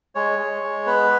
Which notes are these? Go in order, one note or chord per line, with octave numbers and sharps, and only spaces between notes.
G#3 C#5
G#3
G#3
B3 B4